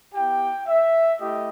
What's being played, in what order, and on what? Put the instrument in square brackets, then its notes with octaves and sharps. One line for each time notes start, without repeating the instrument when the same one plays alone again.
[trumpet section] B3 E4 G4 G5
E5
A3 E4 G4 D#5